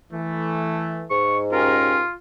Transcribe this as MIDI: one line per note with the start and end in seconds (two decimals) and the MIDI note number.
0.13 1.06 52
0.13 1.06 57
1.10 2.03 44
1.10 1.38 85
1.52 2.02 61
1.52 2.14 65
1.52 2.02 67
1.52 2.02 70